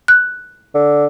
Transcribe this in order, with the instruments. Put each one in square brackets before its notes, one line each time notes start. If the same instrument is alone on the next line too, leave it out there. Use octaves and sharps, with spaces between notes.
[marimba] F#6
[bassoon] D3